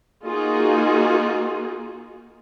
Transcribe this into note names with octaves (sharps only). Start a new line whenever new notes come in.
A#3 D#4 F4 F#4 G#4